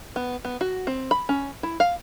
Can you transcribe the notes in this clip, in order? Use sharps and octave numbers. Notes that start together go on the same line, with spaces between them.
B3
B3
F#4
C4
B5
C#4
E4
F5